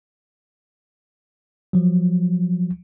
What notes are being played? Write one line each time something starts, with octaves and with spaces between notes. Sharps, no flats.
F3 F#3